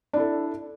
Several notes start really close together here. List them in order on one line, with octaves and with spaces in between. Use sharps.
D4 E4 A4